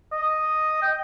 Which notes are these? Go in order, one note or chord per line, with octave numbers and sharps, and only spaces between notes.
D#5
G5